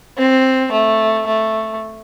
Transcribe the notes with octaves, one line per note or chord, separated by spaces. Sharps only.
C4
A3
A3